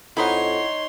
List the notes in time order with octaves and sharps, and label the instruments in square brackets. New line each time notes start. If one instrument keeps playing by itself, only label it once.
[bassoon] F2 [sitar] D#4 [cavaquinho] E4 D#5 F#5 [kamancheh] C#5 C6